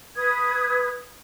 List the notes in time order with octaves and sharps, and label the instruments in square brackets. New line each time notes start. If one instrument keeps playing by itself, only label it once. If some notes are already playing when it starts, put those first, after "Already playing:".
[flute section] B4 D#6 G#6